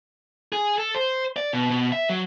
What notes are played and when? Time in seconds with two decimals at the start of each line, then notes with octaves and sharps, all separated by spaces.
0.53 G#4
0.78 A4
0.95 C5
1.36 D5
1.53 B2
1.70 B2
1.92 E5
2.09 F#3